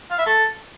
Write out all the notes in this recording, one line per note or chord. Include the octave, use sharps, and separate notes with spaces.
F5
E5
A4